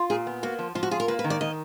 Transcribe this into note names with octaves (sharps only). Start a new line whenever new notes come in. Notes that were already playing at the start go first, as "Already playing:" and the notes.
Already playing: F4
A#2 G#4
B3
A#3 F#4
F3
F3 F4
F#4
F4 G#4
A#4
A#3 B4
B4
D#3
D5
D#3 D#5